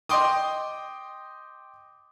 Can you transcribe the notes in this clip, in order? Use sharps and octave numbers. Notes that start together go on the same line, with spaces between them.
D#5 G5 C6 D6 D#6